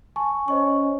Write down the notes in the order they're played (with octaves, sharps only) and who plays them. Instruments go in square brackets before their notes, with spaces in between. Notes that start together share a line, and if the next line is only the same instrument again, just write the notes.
[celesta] G#5 A5 C#6
[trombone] C#4 [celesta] C5 D#5 C#6